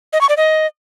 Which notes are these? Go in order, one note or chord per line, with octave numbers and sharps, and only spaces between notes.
D#5
C#6
D5
D#5